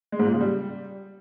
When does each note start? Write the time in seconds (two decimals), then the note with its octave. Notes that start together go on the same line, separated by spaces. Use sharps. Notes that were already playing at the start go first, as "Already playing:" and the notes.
0.12 G#3
0.19 G#2
0.26 A#2
0.33 C#3
0.40 G3